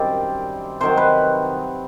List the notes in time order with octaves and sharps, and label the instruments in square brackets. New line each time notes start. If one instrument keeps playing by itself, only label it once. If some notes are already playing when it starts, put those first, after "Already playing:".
Already playing: [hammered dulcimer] F#2 D#3 G3 C4 D5
C3 D#3 F#3 C5
B4